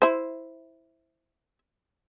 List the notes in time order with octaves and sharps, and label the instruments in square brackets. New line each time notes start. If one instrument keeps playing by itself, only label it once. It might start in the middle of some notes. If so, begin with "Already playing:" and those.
[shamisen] E4 C5